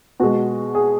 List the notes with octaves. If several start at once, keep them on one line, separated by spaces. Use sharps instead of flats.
B2 G#3 F#4
G#4